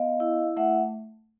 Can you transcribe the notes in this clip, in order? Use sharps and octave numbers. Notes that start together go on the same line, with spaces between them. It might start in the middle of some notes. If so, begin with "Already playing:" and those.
Already playing: B3 D#5 F5
E4
A3 E5 F#5